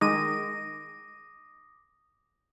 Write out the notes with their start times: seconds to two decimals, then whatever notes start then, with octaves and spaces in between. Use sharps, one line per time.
0.01 D#3 G#3 D6 D#6 A#6 D#7